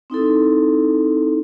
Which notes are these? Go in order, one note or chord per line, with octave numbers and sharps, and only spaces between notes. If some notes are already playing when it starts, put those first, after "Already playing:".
C4 D#4 E4 A4